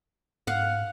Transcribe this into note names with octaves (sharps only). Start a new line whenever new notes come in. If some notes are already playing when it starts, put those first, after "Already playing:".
G#2 F5 F#5